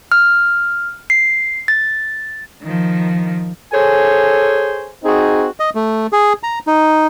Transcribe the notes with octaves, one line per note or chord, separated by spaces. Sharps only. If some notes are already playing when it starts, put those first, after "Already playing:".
F6
C7
A6
D#3 F3
G#4 A4 C5 C#5 G#5
C4 D#4 F#4 G#4
D#5
A3
G#4
A#5
D#4